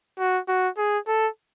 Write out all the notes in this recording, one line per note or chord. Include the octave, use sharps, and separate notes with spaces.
F#4
F#4
G#4
A4